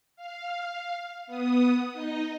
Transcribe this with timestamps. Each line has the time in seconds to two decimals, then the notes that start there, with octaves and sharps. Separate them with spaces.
0.16 F5
1.27 B3 D#6
1.93 D#4 D#5